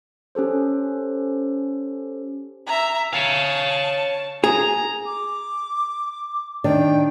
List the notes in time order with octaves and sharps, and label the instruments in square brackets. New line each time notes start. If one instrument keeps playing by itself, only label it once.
[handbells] C#4 G4 A4 C5
[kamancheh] E5 A#5
[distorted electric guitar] C#5 F5 [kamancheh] A5
[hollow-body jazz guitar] G#4 [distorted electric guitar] A#5
[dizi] D6
[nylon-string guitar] D#3 D4 D5 [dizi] G5